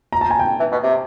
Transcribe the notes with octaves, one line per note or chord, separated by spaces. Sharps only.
A#5
A5
G#5
G5
E3
B2
C3